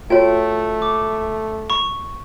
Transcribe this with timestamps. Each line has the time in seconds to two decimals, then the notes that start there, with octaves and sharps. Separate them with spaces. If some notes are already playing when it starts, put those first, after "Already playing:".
0.10 A3 F4 F#4 C#5 G5
0.82 D6
1.70 B5 C#6